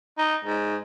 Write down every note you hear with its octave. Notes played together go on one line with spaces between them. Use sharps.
D#4
G#2